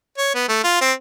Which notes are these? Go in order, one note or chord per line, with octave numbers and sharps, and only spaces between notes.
C#5
B3
A3
F4
C4